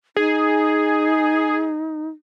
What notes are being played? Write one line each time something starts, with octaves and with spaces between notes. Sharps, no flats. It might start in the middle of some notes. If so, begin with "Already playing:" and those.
D#4 G#4